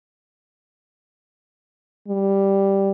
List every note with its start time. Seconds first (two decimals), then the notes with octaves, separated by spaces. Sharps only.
2.08 G3